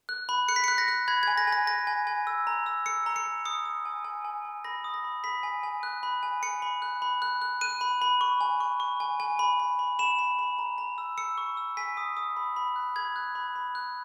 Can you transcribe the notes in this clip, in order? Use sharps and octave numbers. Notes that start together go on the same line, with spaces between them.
F#6
B5
F#6 C#7
B6
C#7
F#6
A#6
F#6
B5 G#6
G#6
G#5
A#6
G#5
A#6
G#5 A#6
G#5
G#5
E6
A#5
E6
E6 C#7
A#5
C#7
A#5
D#6 C#7
D#6
G#5
G#5
G#5
G#5
B5 A#6
D#6
A#6
B5
B5 B6
G#5
G#5
F#6
B5
G#5
G#5 C#7
B5
F#6
B5
F#6
F#6
F#6 D#7
B5
B5
C#6
G#5
C#6
C#6
G#5
G#5
B5
B5
B5
B5 E7
B5
B5
A#5
A#5
E6
E6 C#7
C#6
E6
G#5 B6
D#6
D#6
B5
B5
F#6
B5 G#6
F#6
B5
B5
F#6